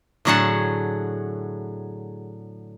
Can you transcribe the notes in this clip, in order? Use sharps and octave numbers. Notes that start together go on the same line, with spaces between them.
A2 D3 F#3 G#4 F#5 A5